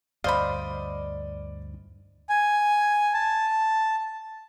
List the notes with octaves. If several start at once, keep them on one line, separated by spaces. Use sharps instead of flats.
D2 G2 C5 D5 D#5 F5 B5
G#5
A5